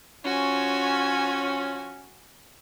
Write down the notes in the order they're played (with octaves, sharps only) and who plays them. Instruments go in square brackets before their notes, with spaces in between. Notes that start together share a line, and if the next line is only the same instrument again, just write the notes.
[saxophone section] F3 C#4 [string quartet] F#4 G#5